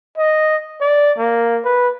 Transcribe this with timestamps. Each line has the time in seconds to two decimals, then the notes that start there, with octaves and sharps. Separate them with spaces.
0.18 D#5
0.81 D5
1.18 A#3
1.65 B4